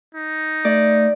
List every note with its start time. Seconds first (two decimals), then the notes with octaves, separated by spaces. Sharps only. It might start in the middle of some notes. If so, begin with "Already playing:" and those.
0.15 D#4
0.65 A3 D5